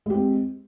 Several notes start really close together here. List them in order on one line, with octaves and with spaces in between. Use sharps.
G#3 G4 C4